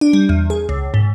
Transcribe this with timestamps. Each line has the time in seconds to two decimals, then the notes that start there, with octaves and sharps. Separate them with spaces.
0.01 D4
0.13 G3
0.29 E2
0.50 G#4
0.69 C#2
0.94 G#2